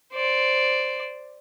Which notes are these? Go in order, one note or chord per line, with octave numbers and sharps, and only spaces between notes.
C5 D5